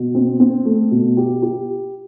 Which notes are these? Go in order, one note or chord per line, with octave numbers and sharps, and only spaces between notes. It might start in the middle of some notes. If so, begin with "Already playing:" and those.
Already playing: B2
C4
C4
A3
B2
G4
G4